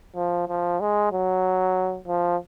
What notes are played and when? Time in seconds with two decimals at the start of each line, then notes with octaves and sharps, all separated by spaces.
0.16 F3
0.48 F3
0.81 G#3
1.12 F#3
2.08 F3